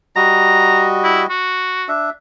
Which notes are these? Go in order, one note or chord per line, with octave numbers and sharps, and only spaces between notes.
G3 F#4 D#5 A#5
E4
F#4
D4 E5